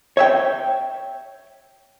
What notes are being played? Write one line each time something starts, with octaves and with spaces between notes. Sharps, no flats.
C#5 E5 G5